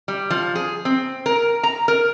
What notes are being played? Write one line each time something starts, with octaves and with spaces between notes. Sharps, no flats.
G3
F3
G#4
C4
A#4
A#5
A#4